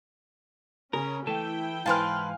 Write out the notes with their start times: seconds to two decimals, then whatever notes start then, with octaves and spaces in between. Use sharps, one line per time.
0.93 C#3 C#4 A#4
1.27 E3 A3 E4 A4 G5
1.86 G#2 E3 B4 C5 F5 G#5 A5 F6